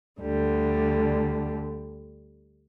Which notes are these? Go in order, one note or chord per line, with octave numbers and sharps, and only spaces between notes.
D2 D3 G3